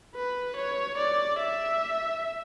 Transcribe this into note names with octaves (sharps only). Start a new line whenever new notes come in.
B4
C#5
D5
E5